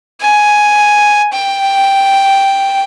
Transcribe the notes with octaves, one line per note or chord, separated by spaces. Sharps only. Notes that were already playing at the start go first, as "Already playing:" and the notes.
G#5
G5